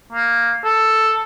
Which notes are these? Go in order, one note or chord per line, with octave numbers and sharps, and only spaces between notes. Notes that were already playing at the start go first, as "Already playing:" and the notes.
A#3
A4